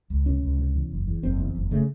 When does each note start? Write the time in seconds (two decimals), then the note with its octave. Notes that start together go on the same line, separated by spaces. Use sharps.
0.10 C#2
0.26 C3 C#4
0.43 C#2
0.58 C3
0.75 E2
0.91 F#1
1.07 E2
1.23 F#1 C4
1.38 E2
1.55 F#1
1.71 C#3 A3